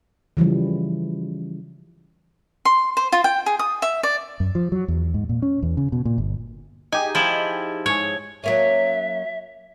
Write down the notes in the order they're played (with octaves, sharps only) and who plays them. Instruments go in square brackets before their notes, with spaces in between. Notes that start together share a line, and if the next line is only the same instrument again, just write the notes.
[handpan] C#3 E3 F3 G3
[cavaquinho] C6
C5
F4
G5
G#4
D#6
E5
D5
[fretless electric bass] F#2
F3
F#3
E2
G#2
A#2
C#4
E2
C#3
B2
A#2
G1
[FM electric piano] D#4 G4 G#4 [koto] G#5
[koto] F3 E4
[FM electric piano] G#2 G#4 [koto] C#5
[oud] F#3 A#3 C#4 [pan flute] E5